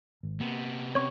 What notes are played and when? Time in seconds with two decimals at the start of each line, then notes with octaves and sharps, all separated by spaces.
0.23 G#1
0.40 C3 A#3 B3
0.95 C4 C#4 C#5 C#6